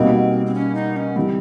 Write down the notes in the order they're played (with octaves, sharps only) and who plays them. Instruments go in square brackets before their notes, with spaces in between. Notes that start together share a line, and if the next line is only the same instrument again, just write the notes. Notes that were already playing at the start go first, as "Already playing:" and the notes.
Already playing: [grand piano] B2 G3 A#3 D#4 F#4 [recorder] C4
[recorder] C4
C#4
D#4
C#4
[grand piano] E3 G3 [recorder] C4